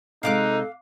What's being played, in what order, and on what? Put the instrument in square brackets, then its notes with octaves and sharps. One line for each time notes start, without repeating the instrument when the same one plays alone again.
[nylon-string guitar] C3 G#3 [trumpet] D#4 [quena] A4 [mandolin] F5 D6 F#6